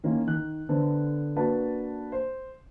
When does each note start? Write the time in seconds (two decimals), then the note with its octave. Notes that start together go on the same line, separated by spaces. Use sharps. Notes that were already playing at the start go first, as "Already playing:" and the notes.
0.04 D#3 A#3 C#4 E4 F4
0.27 D#3 F#6
0.69 D3 B3 D4 A4 C5
1.36 A#3 D4 F#4 B4 A5
2.12 C5